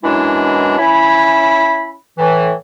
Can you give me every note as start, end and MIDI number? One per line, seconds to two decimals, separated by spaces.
0.03 0.73 42
0.03 0.73 47
0.03 0.73 52
0.03 0.73 56
0.03 0.73 62
0.03 0.73 64
0.78 1.94 61
0.78 1.94 64
0.78 1.94 83
2.18 2.52 45
2.18 2.52 52